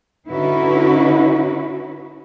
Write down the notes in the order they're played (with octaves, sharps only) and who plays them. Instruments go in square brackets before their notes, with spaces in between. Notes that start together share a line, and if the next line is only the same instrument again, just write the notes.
[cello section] D3 C#4 D#4 E4 F#4 B4